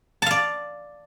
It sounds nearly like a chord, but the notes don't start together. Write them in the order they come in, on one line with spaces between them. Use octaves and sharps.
A5 F5 D5